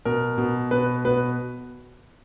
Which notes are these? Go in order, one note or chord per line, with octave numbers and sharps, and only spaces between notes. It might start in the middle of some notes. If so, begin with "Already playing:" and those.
B2 A#4
B2
B2 B4
B2 B4